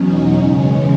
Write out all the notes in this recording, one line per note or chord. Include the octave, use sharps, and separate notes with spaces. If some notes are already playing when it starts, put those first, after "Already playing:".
Already playing: E2 B2 F#3 C#4 D#4
F#2 C#3 E3 G#3 C#4